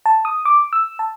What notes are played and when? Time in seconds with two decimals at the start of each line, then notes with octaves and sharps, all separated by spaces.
0.06 A5
0.25 D#6
0.45 D6
0.73 E6
0.99 A5